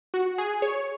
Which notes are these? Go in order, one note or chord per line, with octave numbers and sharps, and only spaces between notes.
F#4
G#4
C#5